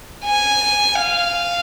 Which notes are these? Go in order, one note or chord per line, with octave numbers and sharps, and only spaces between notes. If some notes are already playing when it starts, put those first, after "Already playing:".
G#5
F5